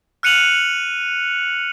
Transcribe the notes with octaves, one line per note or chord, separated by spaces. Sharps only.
F6 F#6 C#7 D#7 F7 F#7